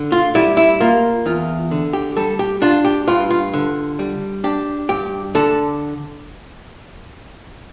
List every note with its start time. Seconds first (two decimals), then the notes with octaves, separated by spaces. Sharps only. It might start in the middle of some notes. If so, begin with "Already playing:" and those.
Already playing: D3
0.12 F4
0.35 G3 E4
0.57 E4
0.80 A#3 F4
1.26 E2 F4
1.71 D3
1.93 G4
2.17 G3 A4
2.39 G4
2.62 D4 F4
2.85 G4
3.07 G2 F4
3.30 F4
3.54 D3
3.99 G3
4.44 D4 G4
4.89 G2 G4
5.35 D3 A4